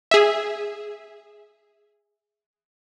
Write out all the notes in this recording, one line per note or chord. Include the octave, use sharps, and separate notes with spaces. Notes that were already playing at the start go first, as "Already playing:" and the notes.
G#4 E5